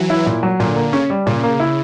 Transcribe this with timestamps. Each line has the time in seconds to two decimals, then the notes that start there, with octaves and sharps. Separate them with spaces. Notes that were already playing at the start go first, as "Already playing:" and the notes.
Already playing: E3 F#3
0.10 E4
0.26 A#2
0.43 F#3
0.60 A#2 D3
0.76 A#3
0.93 C#3 C#4
1.10 G3
1.27 A#2 C#3
1.44 A#3
1.60 E4